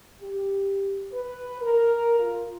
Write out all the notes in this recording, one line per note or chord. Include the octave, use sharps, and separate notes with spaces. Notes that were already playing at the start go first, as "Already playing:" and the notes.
G4
B4
A#4
F4